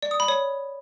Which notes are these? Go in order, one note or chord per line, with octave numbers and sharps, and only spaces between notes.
D5
D#6
B5
C#5